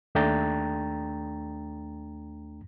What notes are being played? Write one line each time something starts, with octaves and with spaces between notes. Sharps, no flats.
D#2 A3 D4 G5 A#5 A6